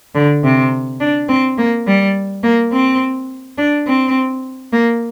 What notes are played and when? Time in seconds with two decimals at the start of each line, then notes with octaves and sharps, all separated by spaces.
0.15 D3
0.43 C3
1.01 D4
1.29 C4
1.58 A#3
1.87 G3
2.43 A#3
2.72 C4
3.58 D4
3.87 C4
4.72 A#3